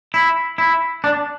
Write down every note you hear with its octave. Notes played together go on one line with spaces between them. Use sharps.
E4
E4
D4